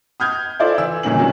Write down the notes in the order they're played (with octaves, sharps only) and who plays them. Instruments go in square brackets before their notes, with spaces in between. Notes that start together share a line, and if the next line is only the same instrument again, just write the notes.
[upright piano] D#6 F6 G6 G#6
E4 F4 A4 C5 D5
E3 E6
G1 A#2 D#3 C#4 F#7
C3 F#3 C#4 D4